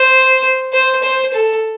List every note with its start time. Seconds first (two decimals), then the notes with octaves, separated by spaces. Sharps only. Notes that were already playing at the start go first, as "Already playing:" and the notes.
Already playing: C5
0.73 C5
1.03 C5
1.33 A4